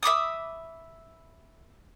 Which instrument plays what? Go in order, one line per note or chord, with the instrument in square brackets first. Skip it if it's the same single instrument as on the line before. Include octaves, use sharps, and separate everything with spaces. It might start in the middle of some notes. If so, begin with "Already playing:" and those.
[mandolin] E5 B5 D6 D#6